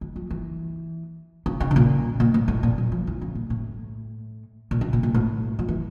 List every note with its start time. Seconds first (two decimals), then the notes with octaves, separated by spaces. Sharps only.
0.01 E3
0.16 F3
0.31 E3
1.46 C#3
1.60 C#3
1.71 C#3
1.76 A#2
2.20 A#2
2.34 A2
2.48 A2
2.63 A#2
2.78 F3
2.92 F3
3.07 E3
3.21 C#3
3.35 A#2
3.50 A2
4.71 A#2
4.81 C#3
4.93 A#2
5.03 A#2
5.14 A2
5.59 F3
5.68 E3